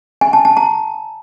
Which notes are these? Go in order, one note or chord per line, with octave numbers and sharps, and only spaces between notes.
G#5
A5
A5
A#5